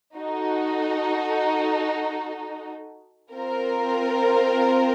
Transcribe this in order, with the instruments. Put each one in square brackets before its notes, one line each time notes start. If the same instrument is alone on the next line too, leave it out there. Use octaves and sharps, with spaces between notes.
[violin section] D#4 F#4 A4
C4 F4 A#4